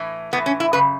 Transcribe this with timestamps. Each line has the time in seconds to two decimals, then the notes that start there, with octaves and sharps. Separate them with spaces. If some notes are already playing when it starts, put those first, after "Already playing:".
Already playing: A2 E3
0.33 A2 E3 B3
0.46 C#4
0.60 E4
0.73 F#2 C#3 B4